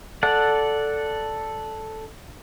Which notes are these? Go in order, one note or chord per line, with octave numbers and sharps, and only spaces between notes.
A4 D5 F#5